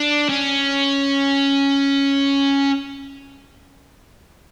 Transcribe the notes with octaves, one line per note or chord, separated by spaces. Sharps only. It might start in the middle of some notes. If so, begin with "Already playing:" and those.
Already playing: D4
C#4